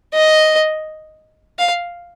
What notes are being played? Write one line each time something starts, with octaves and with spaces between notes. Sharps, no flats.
D#5
F5